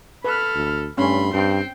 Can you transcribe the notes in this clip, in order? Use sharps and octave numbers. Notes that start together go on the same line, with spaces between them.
A4 B4 B5 F6
D2
G2 A3 C#4 B5 C6
G2 C4 G5 C7